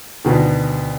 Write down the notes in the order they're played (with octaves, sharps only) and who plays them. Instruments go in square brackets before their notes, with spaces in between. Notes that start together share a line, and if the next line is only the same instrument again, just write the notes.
[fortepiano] D2 B2 D#3